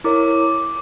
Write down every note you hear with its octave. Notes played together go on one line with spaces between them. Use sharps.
E4 A#4 C#5 D6